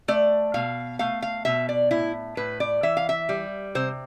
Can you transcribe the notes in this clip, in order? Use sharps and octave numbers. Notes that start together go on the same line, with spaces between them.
A3 D5
B2 F5
A3 F5
F5
B2 E5
D5
A2 E4
A2 B4
D5
E3 E5
F5
E5
G3
C3 C5